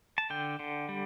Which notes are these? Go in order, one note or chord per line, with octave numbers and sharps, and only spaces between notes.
A5
D3 G5
D3
G3